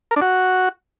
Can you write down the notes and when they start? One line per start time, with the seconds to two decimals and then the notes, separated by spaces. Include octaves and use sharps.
0.11 A#4
0.16 D4
0.22 F#4